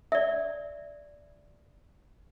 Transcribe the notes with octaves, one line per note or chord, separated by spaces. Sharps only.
D5 E5